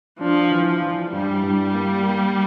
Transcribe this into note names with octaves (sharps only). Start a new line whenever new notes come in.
F3 D4
E3
F3
E3
G2 G3
G2
A#3
A#3